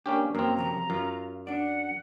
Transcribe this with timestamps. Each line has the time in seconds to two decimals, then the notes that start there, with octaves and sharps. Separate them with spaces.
0.06 A#3 C#4 D4 G4
0.35 F#2 A#3 C4 A#5
0.57 C3 F3 F#3 A#5
0.90 F#2 F4
1.47 D4 D5 F#5